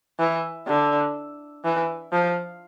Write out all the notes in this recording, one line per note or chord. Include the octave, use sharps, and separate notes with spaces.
E3
D3
E3
F3